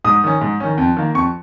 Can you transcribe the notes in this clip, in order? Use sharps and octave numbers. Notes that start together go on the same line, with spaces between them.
G#2 D#6
D#3 C#4
G#2
D#3 C#4
F2
D#3 A#3
F2 C#6